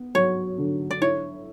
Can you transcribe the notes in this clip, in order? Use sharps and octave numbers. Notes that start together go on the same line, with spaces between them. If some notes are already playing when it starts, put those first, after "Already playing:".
Already playing: B3
F#3 C#5
D3
D5
E4 C#5